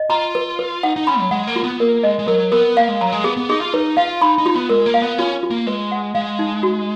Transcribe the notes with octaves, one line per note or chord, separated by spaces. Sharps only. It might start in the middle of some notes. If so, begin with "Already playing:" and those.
Already playing: D#5
F4 A#5
B4
B4
D#4 F#5
D#4
C#4 B5
F#3
G#3 F#5
A#3
F4
B3
A#3 A#4
G#3 D#5
G#3
F#3 A#4
B3 A#4
A#3 F5
G#3
F#3 A#5
G#3
B3 G#4
B3
D#4 G#4
F4
D#4 B4
F4 F5
D#4 B5
D#4
F4
B3
G#3 A#4
A#3
F5
B3
C#4 F4
F4
A#3
G#3 B4
F#5
G#3 F5
D#4
F#4